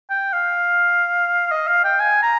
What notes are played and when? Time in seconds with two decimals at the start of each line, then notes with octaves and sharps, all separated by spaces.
0.10 G5
0.33 F5
1.51 D#5
1.68 F5
1.84 G5
2.00 G#5
2.23 A#5